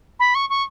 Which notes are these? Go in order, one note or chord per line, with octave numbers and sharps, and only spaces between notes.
B5
C#6
C#6